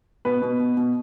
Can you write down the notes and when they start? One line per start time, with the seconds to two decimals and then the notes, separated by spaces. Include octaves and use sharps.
0.25 B2 B4
0.42 B2
0.59 B2
0.77 B2